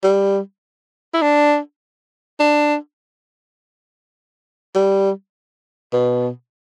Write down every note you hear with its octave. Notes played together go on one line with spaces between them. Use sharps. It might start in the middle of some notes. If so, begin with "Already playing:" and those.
G3
E4
D4
D4
G3
B2